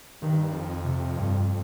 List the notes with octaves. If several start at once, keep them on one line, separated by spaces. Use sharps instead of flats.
G2 D#3
F2
C3
G2